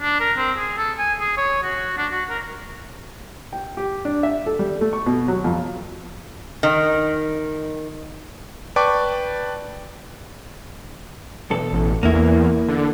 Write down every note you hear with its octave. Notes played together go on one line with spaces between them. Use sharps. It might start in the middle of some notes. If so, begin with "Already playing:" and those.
D4
A#4
C4
G#4
A4
G#5
G#4
C#5
F#4
D4
F#4
A#4
G5
G4
D4
E5
A4
G3
A3
C#6
B2
F#3
F2
D#3
B4 D5 G5 A5 C#6 D6
B1 E2 A4
A1
E2 A#3 E4
D3